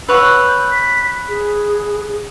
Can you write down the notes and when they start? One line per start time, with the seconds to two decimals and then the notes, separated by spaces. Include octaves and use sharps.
0.09 B4 C#5 F#5 E6
0.48 G6
0.71 B6
1.29 G#4